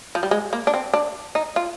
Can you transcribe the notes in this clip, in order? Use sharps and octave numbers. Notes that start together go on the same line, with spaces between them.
F3
G3
G#3
A#3
D4
C4
D4
D#4
F4